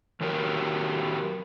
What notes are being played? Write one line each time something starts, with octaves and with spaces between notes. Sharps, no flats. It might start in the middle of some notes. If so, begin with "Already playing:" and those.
D#3 F#3 G4 A#4